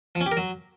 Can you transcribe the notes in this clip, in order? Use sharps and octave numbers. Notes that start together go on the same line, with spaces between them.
F3
C#4
G4
A#4
F#3